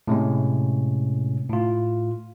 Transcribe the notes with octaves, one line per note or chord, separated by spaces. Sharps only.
A2 C3 G#3 C#4
A2 F4